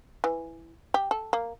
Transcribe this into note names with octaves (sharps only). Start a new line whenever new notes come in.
E3
G4
A4
A#3